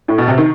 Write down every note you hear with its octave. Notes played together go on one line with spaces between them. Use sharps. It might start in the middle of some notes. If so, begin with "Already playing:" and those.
A2
B2
C3
D#3